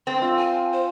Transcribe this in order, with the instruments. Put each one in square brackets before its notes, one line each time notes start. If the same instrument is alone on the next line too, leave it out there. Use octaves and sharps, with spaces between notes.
[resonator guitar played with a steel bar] C4 [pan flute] C6
[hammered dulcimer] F4 [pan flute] E6
[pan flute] G#5
C5